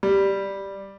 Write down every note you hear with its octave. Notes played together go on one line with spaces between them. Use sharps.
G3